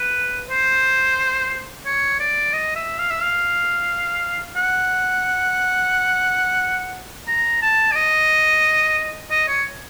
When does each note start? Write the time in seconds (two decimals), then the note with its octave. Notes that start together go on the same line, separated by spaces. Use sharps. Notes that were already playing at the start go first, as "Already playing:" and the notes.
Already playing: B4
0.49 C5
1.86 C#5
2.20 D5
2.53 D#5
2.75 E5
2.98 F5
3.10 E5
3.21 F5
4.56 F#5
7.28 A#5
7.62 A5
7.92 D5
7.95 D#5
9.31 D#5
9.48 C#5